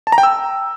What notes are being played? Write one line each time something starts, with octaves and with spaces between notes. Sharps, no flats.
A5
A#5
G5
E6